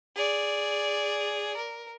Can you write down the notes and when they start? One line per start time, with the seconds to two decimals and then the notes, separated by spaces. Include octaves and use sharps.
0.16 G#4 D5
1.57 A#4